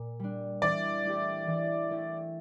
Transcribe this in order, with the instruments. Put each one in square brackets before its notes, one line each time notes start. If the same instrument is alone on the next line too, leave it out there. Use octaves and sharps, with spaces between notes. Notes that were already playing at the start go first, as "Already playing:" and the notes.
Already playing: [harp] A#2
G3 D4
[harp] E3 [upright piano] D5
[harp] A3 E4 G4
E3
A3 E4 G4